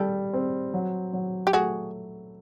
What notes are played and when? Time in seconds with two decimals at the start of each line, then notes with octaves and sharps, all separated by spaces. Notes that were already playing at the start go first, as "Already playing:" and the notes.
Already playing: G3 G4 A4
0.33 C4
0.74 F#3
1.13 F#3
1.47 G4
1.53 A3 F#4 G#4